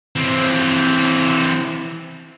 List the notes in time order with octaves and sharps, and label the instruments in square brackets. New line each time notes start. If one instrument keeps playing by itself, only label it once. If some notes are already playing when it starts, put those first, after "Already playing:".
[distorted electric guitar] E3 C4